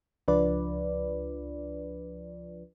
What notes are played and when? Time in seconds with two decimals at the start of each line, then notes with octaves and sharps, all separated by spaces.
0.28 C#2 F3 D4 F4 B4 D5